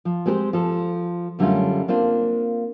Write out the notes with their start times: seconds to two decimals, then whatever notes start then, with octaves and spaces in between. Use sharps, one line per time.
0.05 F3
0.26 G#3 C4 G4 A#4 C5
0.53 F3 A4
1.39 F#2 D3 G3 A3 C#4 F4
1.88 A#3 C4 D4 F4